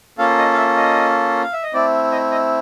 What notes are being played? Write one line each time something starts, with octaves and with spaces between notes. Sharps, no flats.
A#3 C#4 F4 A4 F5
D#5
F5
E5
D#5
F5
E5
D#5
A3 C4 E4 D5
D#5
D#5